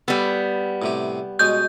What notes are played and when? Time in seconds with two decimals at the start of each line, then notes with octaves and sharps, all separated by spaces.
0.08 G3 B3 A4
0.82 A2 C3 G4
1.39 B2 G#3 C#4 G6